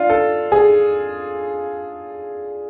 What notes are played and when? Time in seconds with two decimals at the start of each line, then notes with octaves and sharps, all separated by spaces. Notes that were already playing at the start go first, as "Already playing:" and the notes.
Already playing: D4 F4
0.10 A4
0.52 G#4